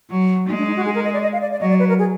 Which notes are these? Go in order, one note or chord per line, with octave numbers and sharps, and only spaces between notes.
F#3
G#3 D#4
D4
D#4
F#4
G#4
A#4
D#5
D5
D#5
F5
D5
D5
F#3 D#5
D5
B4
A#4
G#4